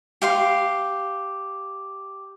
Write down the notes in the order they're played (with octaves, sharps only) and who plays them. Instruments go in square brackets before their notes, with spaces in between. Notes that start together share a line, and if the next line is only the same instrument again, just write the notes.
[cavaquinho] G4 F5 C6